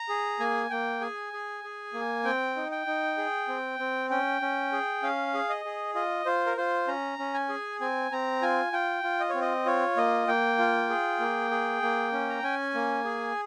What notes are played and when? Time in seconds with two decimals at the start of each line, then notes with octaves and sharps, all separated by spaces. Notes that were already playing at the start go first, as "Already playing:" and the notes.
Already playing: A#5
0.09 G#4
0.40 A#3 G#5
0.70 A#3 G5
1.01 G#4 G#5
1.33 G#4
1.64 G#4
1.94 A#3
2.24 C4 G5
2.56 D#4
2.72 G5
2.86 D#4
3.18 G#4
3.48 C4
3.79 C4
4.10 C#4 G5
4.42 C#4
4.72 G#4
5.03 C#4 F5
5.34 G#4
5.49 D#5
5.65 G#4
5.95 F4 D#5
6.26 F4 C5
6.46 A#4
6.57 F4 C5
6.88 C#4 A#5
7.19 C#4
7.34 G#5
7.49 G#4
7.81 C4 G#5
8.12 C4 A#5
8.42 F4 G#5
8.73 F4 G5
9.03 F4
9.20 D#5
9.29 C4 C#5
9.41 D#5
9.65 F4 C#5
9.97 A#3 D#5
10.28 A#3 G5
10.58 F4
10.89 G#4
11.20 A#3
11.51 G#4
11.82 A#3
12.12 C#4
12.30 A#5
12.43 C#4 G#5
12.74 A#3
13.05 G#4